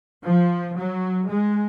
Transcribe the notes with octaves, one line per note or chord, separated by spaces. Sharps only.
F3
F#3
G#3